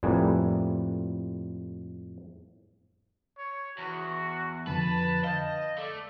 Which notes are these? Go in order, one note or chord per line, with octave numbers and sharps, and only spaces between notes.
F2 A2 G3 A#3 B4 G#5
C#5
E2 F#4
F2 D3 F3 B4 A5
D#5 F5 G6
A3 D5